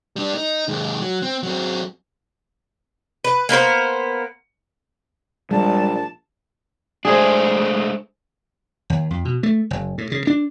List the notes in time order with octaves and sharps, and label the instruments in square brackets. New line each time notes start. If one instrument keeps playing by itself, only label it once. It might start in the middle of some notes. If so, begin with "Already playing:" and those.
[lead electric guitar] G3 D4
D#4
D#2 G#2
F#3
C4
F#3 C4
[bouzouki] B4
A#3 B3 A#4 C5
[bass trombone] A#1 [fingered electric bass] G3 G#3 [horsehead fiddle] A5
[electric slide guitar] G#3 A3 D4 [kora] G#4 C5
[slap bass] D#2
F2
B2
A3
F#1
A2
C#3
D4